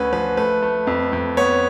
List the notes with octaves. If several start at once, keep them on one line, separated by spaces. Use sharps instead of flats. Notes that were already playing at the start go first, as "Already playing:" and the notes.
Already playing: D2 C#4 B4
F3 B4
A3 B4
A3
F2
F2
B3 C#5